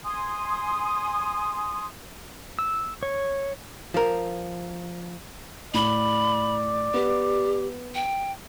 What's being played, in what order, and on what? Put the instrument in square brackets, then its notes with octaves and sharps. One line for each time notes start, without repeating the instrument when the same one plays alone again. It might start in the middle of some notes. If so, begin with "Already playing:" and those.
[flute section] G#5 C6 D#6
[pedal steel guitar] E6
C#5
[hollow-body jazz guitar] F3 A#4
[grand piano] A2 G7 [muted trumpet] D5 [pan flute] B5
[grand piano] B3 [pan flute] G4
[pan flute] G5